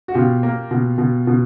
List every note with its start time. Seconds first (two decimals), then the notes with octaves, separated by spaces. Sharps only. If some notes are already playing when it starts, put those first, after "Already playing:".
0.08 F#4
0.14 B2 F4 G4
0.43 A#3
0.71 B2
0.98 B2
1.27 B2